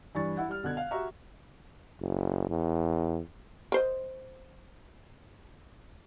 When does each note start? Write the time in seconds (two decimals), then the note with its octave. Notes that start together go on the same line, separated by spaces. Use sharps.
0.15 G2 E3 D4 C#6 A6
0.37 E4 F#5
0.49 G3 F6
0.63 B2 D3 F#6 G#6
0.77 F5
0.91 F#4 G4 E5 A#5 C#6
2.00 F#1
2.50 E2
3.72 A#4 C5 D#5